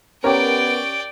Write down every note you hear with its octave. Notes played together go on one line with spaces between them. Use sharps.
B3 C#4 G4 A#4 C#5 D5 G5